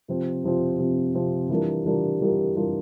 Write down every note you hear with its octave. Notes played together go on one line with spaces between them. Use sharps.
C3 F3 C4
C3 F3 C4
C3 F3 C4
C3 F3 C4
E3 G3 D4 F4 A#4
E3 G3 D4 F4 A#4
E3 G3 D4 F4 A#4
E3 G3 D4 F4 A#4